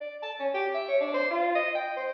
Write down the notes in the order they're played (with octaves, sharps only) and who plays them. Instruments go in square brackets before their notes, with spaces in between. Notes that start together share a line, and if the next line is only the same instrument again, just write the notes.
[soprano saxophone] D5
A5
C#4
G4
E5
C#5
D4
C5
F4
D#5
G5
C5